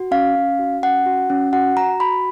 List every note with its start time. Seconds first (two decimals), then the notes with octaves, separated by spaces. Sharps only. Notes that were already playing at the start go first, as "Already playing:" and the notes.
Already playing: F#4
0.11 C#4 F5
0.35 C#4
0.59 F#4
0.83 C#4 F#5
1.06 F#4
1.30 C#4
1.53 F#4 F#5
1.77 F#4 A#5
2.00 F#4 B5